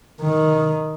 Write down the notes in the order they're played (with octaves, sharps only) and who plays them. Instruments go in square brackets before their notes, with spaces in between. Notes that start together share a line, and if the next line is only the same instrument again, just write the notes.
[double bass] D#3